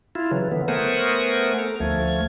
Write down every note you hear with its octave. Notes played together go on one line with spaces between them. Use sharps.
E4 F4
C#3 E3 F#3
D3 E3 B3
A3 B3 A#4 C5 F#5 G#5
A4 A#5
D2 F3 A3 G#6